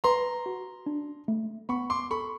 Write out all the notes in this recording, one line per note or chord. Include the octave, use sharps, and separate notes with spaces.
B4 A#5 C6
F#4
D4
A3
B3 B5 C#6
C6 D6
A4 B5 C#6